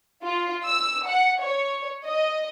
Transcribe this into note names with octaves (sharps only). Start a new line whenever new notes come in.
F4
E6
F#5
C#5
D#5